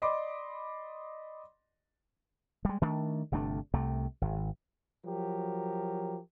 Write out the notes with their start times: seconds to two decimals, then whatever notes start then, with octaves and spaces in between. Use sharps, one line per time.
0.02 D5 D#5 B5 C6 D6
2.65 G3 G#3
2.82 D#3 A3 D4
3.32 G1 C3 A3 D4
3.74 C2 C3 A3
4.22 G#1
5.05 F3 F#3 G4 A#4